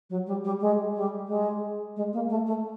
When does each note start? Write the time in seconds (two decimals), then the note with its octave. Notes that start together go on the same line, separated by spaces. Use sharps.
0.10 F#3
0.27 G3
0.44 G3
0.61 G#3
0.95 G3
1.28 G#3
1.96 G#3
2.13 A#3
2.30 A3
2.47 A3